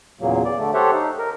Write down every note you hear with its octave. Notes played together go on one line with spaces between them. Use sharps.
E2 A#2 C#3 F#3 A#3
D5
D3 A3
G4 A4 C5 C#5 E5 F#5
D#4
A#4